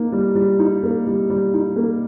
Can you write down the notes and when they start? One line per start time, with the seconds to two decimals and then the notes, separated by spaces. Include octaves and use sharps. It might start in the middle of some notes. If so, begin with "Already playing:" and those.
Already playing: A#3 D#4
0.12 G3
0.35 G3
0.59 D#4
0.83 A#3
1.07 G3
1.30 G3
1.54 D#4
1.76 A#3